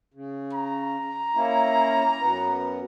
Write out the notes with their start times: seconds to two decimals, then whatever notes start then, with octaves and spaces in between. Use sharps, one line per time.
0.14 C#3
0.54 A#5
1.35 A#3 C#4 E4
2.20 F#2 B3